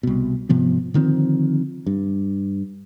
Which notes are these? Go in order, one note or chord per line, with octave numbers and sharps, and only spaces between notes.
C2 B2
G#2 C3 F3 B3
D3 D#3 F3 C4
G2